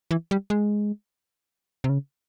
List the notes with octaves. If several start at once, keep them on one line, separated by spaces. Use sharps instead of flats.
E3
G3
G#3
C3
C#3